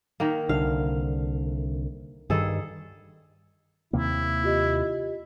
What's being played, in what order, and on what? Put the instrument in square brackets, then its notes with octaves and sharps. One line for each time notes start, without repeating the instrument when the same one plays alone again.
[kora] D#3 A#3
[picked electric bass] C2 D3 [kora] F5
[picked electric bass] G2 D#3 G3 [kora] G#4 A4
[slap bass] D#2 C3 A#3 [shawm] E4
[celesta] F4 G4 D#5